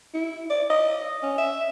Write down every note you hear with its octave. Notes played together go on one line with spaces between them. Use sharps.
E4
D5
D#5
C#4
E5